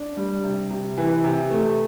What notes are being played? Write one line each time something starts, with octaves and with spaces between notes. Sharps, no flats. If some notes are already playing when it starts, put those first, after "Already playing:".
Already playing: D4
G3
C3
C3
E3
C3
A3